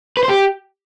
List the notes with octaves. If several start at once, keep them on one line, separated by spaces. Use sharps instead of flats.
B4
C5
G4